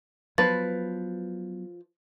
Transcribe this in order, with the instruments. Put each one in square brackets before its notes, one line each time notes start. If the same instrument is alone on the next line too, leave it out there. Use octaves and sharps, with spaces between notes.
[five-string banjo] F3 B4 [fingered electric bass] F#3 B3 [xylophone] A6